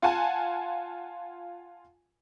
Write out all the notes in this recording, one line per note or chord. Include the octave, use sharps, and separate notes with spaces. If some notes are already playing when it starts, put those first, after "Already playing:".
F4 F#5 G#5 A5